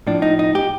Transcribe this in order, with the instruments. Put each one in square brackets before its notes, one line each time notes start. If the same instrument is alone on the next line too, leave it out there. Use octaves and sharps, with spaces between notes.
[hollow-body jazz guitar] A2 F3 D4
D#4
D#4
G4